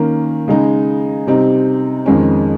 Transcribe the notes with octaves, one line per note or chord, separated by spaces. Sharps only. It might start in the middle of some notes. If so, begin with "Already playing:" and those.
Already playing: D#3 A#3 C#4
C#3 G#3 D#4
C3 G3 C4 D#4
F2 D#3 G#3 C#4